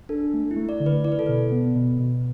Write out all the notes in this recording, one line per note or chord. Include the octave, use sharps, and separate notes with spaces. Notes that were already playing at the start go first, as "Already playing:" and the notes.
D4 A4
A3
E4
A3
D5
D3
B4
E4 D5
B4
A4
B2 B4
B3
B2
B2